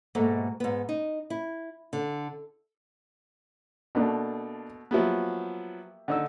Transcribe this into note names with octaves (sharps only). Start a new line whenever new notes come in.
G#2 B2 A3 A#3
G#2 B3
D#4
E4
D3
B2 A3 A#3 D4
F3 F#3 A#3 B3 G4 E5
D3 D#4 E6